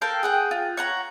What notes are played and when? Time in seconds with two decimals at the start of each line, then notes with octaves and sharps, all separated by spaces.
0.01 A4 A#4 F5 G5
0.23 G#4 F#5 G5
0.51 F4
0.77 C#5 F#5 A#5